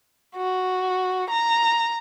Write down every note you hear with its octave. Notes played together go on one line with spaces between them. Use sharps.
F#4
A#5